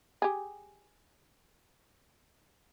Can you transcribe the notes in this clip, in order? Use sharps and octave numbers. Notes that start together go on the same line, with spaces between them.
G4 G#4